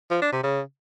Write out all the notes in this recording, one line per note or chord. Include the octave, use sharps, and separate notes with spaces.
F3
D4
C3
C#3